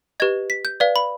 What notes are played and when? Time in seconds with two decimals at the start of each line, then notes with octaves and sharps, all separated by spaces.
0.20 G4 B4 D#5 G#6
0.50 B6
0.65 G6
0.80 B4 D5 F5
0.96 B5